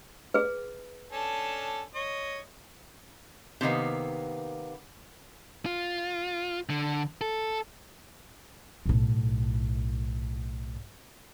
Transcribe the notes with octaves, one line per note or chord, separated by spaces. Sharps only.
G#4 B4
C#4 D4 A4
C#5 D#5
C3 D#3 A#3 B3
F4
D3
A4
B1 A2